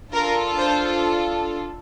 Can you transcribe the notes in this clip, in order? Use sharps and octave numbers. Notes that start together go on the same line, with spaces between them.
D4 F4 A4 A#4
C5